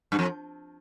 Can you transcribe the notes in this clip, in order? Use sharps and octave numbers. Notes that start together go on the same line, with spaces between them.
G2
F2